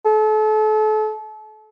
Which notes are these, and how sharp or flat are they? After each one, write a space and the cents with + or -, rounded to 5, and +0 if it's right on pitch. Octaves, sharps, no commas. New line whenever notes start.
A4 -35